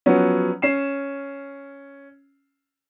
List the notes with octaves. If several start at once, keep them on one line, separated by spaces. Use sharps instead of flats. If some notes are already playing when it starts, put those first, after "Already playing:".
F3 F#3 B3 C#4
C#4 C7 E7